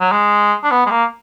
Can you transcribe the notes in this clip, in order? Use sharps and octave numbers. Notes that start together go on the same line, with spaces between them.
F#3
G#3
D4
B3
G#3
A#3